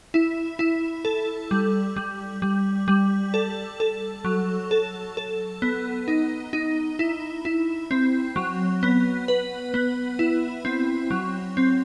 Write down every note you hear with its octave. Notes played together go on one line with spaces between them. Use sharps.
E4
E4
A4
G3
G3
G3
G3
A4
A4
F#3
A4
A4
B3
D#4
D#4
E4
E4
C4
F#3
B3
B4
B3
E4
C4
F#3
C4